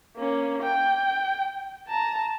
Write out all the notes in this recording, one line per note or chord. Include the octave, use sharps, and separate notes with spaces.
A#3 C#4
G5
A5 A#5